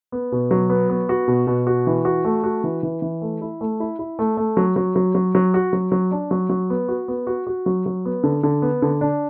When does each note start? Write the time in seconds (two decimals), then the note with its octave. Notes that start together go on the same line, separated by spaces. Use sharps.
0.12 B3
0.32 B2
0.51 F#3
0.70 B3
0.90 B3
1.09 F#4
1.28 B2
1.47 B2
1.67 F#4
1.87 E3
2.05 F#4
2.25 A3
2.44 F#4
2.64 E3
2.83 E3
3.02 E3
3.22 A3
3.41 E4
3.61 A3
3.80 E4
3.99 E4
4.19 A3
4.37 A3
4.57 F#3
4.76 F#3
4.96 F#3
5.15 F#3
5.35 F#3
5.54 F#4
5.73 F#3
5.92 F#3
6.11 D4
6.31 F#3
6.50 F#3
6.70 B3
6.88 F#4
7.08 B3
7.27 F#4
7.47 F#4
7.66 F#3
7.86 F#3
8.05 B3
8.23 D3
8.43 D3
8.62 B3
8.82 D3
9.01 D4